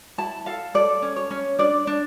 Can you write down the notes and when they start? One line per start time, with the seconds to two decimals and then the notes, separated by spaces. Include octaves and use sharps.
0.18 E4 A5
0.46 A4 F5
0.74 A4 D5
1.02 C#4
1.16 C#5
1.31 C#4
1.59 D4 D5
1.87 D4